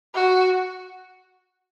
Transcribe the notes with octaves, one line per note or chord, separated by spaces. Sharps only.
F#4